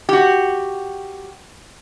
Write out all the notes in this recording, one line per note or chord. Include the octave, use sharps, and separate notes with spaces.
F#4 G4